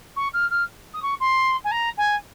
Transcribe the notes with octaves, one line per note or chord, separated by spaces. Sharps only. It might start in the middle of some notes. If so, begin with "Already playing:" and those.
C#6
F6
F6
D#6
C#6
C6
G#5
A#5
G#5